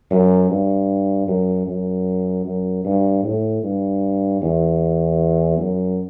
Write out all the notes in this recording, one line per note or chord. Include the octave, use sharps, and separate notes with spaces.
F#2
G2
F#2
F#2
F#2
G2
A2
G2
E2
F#2